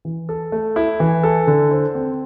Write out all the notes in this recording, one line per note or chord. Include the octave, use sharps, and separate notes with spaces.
E3
A4
A3
E4
E3
A4
D3
C5
C4